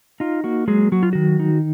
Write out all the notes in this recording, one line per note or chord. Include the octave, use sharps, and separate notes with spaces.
D#4 F4
A#3 F#4
F#3 G#3 G#4
F#3 F#4
F4
D#3 F#4
D#4